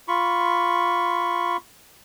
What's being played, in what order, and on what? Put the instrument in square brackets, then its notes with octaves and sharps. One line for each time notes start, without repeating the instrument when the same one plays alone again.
[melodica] F4 B5 C#6